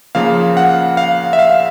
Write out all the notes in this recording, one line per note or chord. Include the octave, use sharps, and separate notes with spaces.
C#3 F3 A#3 F5
F#5
F5
E5
F5